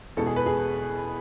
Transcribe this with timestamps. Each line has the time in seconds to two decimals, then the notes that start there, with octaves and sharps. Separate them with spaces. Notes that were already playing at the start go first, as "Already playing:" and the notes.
0.17 E2 B2 G#3 A4
0.27 G#4
0.36 B4
0.46 G#4